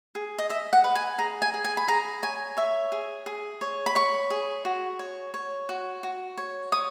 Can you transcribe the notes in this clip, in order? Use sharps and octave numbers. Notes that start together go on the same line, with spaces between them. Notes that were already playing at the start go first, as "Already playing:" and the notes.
G#4
D#5
D#5 E5
F#5
B4
G#5
G#4 A#5
G#5
G#4
G#5
B5
G#4 A#5
C#5 G#5
C#5 E5
G#4
G#4
C#5
B5
C#5 C#6
G#4
F#4
C#5
C#5
F#4
F#4
C#5
C#5 D#6